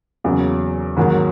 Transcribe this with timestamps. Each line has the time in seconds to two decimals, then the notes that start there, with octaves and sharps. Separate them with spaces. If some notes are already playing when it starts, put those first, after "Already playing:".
0.24 E2 C#3 F#3 A#3
0.97 G#2 D#3 F#3 A#3